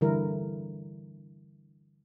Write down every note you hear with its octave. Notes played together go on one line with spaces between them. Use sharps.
D3 E3 G3 E4 A#4